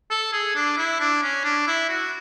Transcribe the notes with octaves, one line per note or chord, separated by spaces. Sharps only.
A4
G#4
D4
E4
D4
C#4
D4
E4
F#4